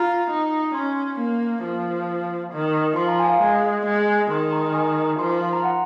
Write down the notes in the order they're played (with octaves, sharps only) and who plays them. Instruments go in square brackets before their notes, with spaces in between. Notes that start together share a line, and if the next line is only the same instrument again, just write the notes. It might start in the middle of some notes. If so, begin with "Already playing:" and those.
Already playing: [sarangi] F4 [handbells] A#5
[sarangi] D#4
[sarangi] C#4 [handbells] C6
[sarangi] A#3
F3
D#3
[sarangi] F3 [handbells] C6
[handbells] A#5
G#5
F5
[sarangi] G#3 [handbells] G#5
[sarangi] G#3
[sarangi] D#3 [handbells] C6
[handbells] A#5
G#5
A#5
[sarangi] F3 [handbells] C6
[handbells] C6
C6
A#5
F#5